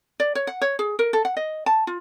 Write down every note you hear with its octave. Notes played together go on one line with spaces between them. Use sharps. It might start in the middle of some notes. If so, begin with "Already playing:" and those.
D5
C#5
F#5
C#5
G#4
A#4
A4
F#5
D#5
A5
F4